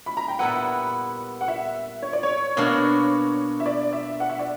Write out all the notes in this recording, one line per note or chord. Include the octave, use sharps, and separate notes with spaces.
B5
A#5
G5
A#2 G3 B3 E4 B4 F#5
F#5
E5
C#5
D5
C#5
B2 A#3 D4 A#4 C#5
E5
D5
E5
F#5
E5
D5